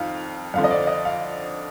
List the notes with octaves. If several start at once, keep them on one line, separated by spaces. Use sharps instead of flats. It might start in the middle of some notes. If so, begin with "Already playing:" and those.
Already playing: F2 D#3 F5
F2 D3 F3 F5
D#5
D5
D#5
F5